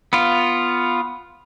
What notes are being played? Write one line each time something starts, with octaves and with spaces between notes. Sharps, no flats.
B3 F4